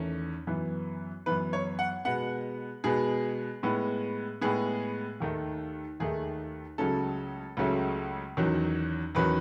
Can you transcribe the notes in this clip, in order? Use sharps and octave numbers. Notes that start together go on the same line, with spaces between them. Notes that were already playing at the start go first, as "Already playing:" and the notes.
Already playing: E2 D#3 A3 C#4
F#2 E3 B3
F#2 E3 B3 B4
C#5
F#5
B2 G#3 B3 F#5
B2 G#3 B3 G#4
A2 G#3 B3
A2 G#3 B3 G#4
D#2 D#3 A3
D#2 D#3 A3 G#4
C#2 C#3 F#3 A3 C#4 A4
C#2 C#3 F#3 A3 C#4
E2 D#3 F#3 C#4
E2 D#3 F#3 C#4 B4